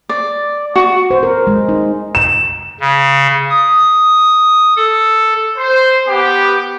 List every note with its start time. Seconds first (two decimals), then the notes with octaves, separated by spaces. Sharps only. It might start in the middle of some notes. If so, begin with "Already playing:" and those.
0.09 D5
0.76 F#4
1.11 C5
1.23 A#4
1.47 G#3
1.69 D#4
2.15 E7
2.80 C#3
3.50 D#6
4.76 A4
5.57 C5
6.07 B3 G4